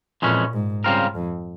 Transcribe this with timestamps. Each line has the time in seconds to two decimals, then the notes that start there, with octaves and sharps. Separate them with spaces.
0.22 F2 A#2 E3 G#3 C#4
0.53 G#2
0.84 C#3 G3 C4 F4 A#4
1.15 F2